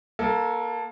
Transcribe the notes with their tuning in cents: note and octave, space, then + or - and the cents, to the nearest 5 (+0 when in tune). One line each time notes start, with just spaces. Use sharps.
A#3 +20 A4 +0